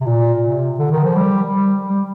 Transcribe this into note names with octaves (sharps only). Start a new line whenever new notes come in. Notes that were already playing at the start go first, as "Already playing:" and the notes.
C3
A#2
C3
D3
D#3
F3
G3
G3
G3